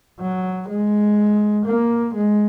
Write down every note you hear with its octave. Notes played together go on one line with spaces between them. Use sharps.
F#3
G#3
A#3
G#3